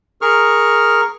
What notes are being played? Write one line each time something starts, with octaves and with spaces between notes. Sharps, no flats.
G#4 A#4 C#6 F6